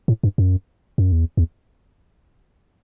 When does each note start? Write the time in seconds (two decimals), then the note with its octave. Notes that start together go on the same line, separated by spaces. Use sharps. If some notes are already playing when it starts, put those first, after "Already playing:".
0.08 A2
0.23 G2
0.38 F#2
0.98 F#2
1.12 E2
1.37 E2